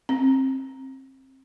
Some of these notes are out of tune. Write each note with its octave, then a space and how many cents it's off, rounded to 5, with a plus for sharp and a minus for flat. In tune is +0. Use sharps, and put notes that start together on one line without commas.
C4 +25